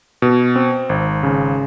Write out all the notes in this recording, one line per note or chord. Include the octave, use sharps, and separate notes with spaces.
B2
C4
G#1
C#3